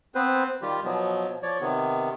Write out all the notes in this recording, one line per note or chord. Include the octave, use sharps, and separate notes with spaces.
B3 C4 B4 C5
D#3 G3 F4 G4
B2 F3 F#3 B3
F3 C#5 D5
C3 D#3 B3